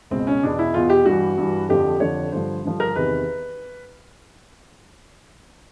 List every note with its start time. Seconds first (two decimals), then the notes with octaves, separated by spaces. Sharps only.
0.11 C#2 B2 C4
0.27 C#4
0.43 E2 B2 D4
0.59 E4
0.74 E2 B2 F4
0.90 G4
1.05 G2 E3 F#4
1.37 G2 E3
1.69 F2 D3 F3 G4
2.00 F2 D3 F3 C#5
2.32 G2 D3 F3 C5
2.64 G2 D3 F3
2.80 A#4
2.95 E2 C3 D#3 B4